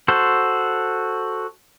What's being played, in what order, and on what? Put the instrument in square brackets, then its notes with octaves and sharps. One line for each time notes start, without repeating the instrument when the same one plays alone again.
[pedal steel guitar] F#4 A4 C5